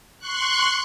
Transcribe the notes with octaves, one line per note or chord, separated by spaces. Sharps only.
C6 C#6 F#6